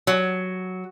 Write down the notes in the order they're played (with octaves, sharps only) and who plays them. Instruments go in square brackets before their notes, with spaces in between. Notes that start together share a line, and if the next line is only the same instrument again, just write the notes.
[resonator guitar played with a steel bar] F#3